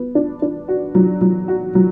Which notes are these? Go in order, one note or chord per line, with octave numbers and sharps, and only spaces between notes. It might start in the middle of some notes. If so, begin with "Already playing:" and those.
Already playing: B3
D4
D4
F#4
F#3
F#3
F#4
F#3